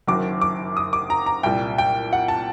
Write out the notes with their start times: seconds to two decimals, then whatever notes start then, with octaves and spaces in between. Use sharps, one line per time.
0.07 F#1 F#2 D#3 F#3 D6
0.41 D6
0.77 D#6
0.93 D6
1.10 A#5
1.26 A#5
1.43 C2 A#2 G3 G5
1.78 G5
2.13 F#5
2.28 A5